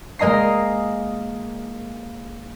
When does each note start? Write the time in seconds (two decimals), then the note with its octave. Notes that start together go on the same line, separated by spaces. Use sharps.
0.19 G#3 A#3 D#5 A#5 C7